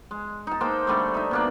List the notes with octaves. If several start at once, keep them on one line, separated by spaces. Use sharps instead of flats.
G#3
D#4 A5
G#3 A#3 C5 G5
D3 G3 A3
D#4 E5
B2 A#3 D4